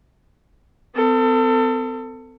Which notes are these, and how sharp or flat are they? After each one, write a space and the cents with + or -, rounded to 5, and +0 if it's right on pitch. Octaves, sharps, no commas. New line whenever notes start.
C4 -40 A4 +30